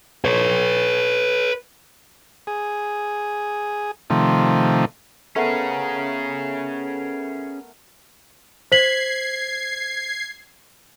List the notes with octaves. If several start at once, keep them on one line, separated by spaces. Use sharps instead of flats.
B4 C#5
G#4
C3 D#3 F3 A3
A3 B3 C#4 G#4 A#4
C5 G#6 B6 C7 F#7